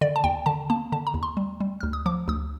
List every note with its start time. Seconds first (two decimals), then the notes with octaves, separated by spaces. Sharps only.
0.01 D3 D5
0.16 A5
0.24 D#2 G5
0.46 D3 A5
0.70 A#3 A5
0.92 D3 A5
1.07 A#5
1.14 D#2
1.23 C6
1.37 G3
1.60 G3
1.81 D2 F6
1.93 D#6
2.06 F3 D6
2.28 D2 D#6